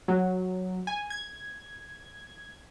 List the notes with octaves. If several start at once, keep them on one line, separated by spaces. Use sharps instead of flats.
F#3
G#5
G#6